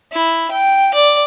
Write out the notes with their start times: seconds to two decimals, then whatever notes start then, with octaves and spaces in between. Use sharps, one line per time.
0.12 E4
0.51 G5
0.94 D5